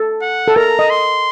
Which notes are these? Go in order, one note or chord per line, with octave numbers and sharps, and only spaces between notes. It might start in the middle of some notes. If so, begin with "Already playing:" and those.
Already playing: A4
F#5
A4
A#4 A#5
D#5
C6